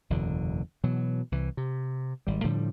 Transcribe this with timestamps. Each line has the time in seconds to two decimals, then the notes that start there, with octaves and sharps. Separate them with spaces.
0.10 F#1 E2 B2 D3
0.84 B2 E3 F#3
1.32 C2 E3
1.57 C3
2.27 G#1 G3
2.44 A2 D3 F3 G3